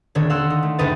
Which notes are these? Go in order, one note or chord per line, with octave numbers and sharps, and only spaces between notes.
D#1 D3 D#3 D4 C#5
F5 F#5 C6 E6
D#4
A3
F#1 D2 D#4 B4 D#5 A6